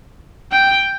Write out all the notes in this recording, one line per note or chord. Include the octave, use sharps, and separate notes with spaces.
G5